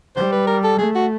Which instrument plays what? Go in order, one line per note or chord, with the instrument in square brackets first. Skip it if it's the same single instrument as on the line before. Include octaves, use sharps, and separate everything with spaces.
[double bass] G3 [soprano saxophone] C5
[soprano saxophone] B4
A#4
A4
[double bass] A3 [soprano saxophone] G#4
[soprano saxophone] F#4